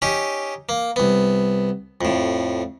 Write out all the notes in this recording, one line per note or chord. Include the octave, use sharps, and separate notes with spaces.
C#4 D#4 G4
A#3
C2 B3
F2 A2